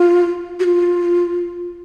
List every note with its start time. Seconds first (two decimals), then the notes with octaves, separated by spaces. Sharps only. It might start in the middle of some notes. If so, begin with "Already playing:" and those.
Already playing: F4
0.60 F#4
0.64 F4